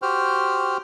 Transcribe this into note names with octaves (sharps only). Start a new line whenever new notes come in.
F#4 G4 C5 G5 F6